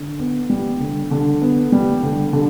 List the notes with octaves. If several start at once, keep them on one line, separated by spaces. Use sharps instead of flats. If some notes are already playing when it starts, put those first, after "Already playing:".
Already playing: D3
B3
G3
D3
D3
B3
G3
D3
D3